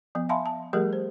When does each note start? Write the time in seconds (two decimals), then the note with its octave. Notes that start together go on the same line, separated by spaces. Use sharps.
0.15 F3 B3
0.29 E5 F5 G#5 A5 B5 C6
0.46 A5
0.73 F3 G3 A3 G4 G#4 A#4
0.93 C5